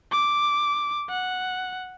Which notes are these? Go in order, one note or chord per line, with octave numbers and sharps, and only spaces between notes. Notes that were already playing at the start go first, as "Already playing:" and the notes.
D6
F#5